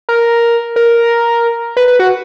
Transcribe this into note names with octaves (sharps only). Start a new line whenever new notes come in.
A#4
A#4
B4
B4
F#4